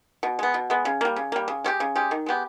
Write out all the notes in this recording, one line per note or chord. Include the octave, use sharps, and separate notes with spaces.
B2
G#3 B3
B2
G#3 B3
C#3
G3 A#3
C#3
G3 A#3
C#3
G#3 C#4 G4
C#3
G#3 C#4 G4
D#3
G#3 B3 G4